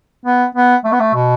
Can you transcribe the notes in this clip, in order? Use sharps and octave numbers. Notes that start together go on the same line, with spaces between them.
B3
B3
A3
B3
A3
B2